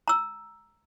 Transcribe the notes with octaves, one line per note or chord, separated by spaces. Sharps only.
A#5 E6